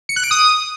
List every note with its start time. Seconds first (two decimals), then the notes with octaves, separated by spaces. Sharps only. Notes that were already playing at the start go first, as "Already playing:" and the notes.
0.09 C#7
0.16 F#6
0.24 D7
0.31 D#6